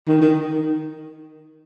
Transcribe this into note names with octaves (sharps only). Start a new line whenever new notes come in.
D#3
D#3